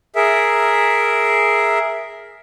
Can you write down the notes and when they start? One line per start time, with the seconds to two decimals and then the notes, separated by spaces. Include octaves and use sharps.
0.16 G#4 A#4 E5